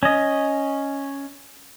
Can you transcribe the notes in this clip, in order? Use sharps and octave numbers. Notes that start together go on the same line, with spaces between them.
C#4 D#5